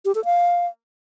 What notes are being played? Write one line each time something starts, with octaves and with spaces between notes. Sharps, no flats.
G4
A4
F5